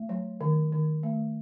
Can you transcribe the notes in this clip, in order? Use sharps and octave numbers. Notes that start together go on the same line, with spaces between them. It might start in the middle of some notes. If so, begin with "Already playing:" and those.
Already playing: A3
F#3
D#3
D#3
A3